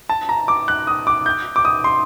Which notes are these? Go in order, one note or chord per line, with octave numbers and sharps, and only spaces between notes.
A5
A#5
D6
F#6
D#6
D6
G6
D6
D#6
C6